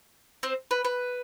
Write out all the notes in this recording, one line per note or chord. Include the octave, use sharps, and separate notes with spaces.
C4 C5
B4
B4